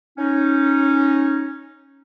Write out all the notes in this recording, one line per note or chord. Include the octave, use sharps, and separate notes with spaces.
C#4 D#4